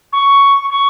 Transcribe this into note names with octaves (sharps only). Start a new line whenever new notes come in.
C#6
C#6